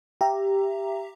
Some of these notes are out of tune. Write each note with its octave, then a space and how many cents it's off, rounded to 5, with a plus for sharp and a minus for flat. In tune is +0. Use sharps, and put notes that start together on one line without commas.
G4 +0 E5 +25 A#5 +0